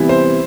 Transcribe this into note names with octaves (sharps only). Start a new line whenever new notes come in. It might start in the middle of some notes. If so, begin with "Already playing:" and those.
Already playing: C3 E3 G3 B3 E4
C5